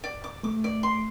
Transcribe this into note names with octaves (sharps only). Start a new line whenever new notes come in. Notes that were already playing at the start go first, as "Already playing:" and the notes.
D5
D6
A3 D6
D5
C6